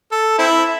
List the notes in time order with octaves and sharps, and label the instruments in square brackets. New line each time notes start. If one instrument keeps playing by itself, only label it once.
[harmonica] A4
C4 E4